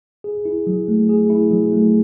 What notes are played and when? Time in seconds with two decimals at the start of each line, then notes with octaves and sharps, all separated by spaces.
0.24 G#4
0.45 E4
0.67 F#3
0.88 A3
1.09 G#4
1.30 E4
1.51 F#3
1.73 A3